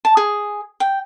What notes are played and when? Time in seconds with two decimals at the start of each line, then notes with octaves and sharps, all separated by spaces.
0.05 A5
0.17 G#4
0.80 G5